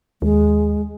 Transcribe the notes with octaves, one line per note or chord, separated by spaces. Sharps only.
D#2 G#3